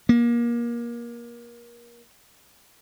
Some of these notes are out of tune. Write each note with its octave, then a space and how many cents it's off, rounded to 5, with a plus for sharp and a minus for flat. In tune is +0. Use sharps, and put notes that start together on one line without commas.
A#3 +25